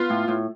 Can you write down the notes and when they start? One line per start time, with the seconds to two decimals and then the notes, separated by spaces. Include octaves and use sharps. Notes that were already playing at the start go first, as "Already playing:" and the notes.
Already playing: B3 F4
0.10 A2
0.28 A2